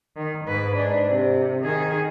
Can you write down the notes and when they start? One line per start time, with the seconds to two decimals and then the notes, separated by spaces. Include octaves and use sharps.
0.17 D#3
0.46 G#2 B4
0.77 D4
1.08 C3
1.64 D#3 G#4